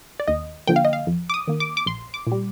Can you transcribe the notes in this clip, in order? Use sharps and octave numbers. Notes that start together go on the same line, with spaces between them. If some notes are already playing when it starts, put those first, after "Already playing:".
D5
D#2 D#5
D3 F3 A#3 G5
F5
D#5
F5
F2
D6
D#6
D#3 A#3
D6
D6
A#1 C6
D6
A#2
G3